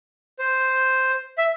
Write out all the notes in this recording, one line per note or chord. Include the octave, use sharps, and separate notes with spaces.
C5
E5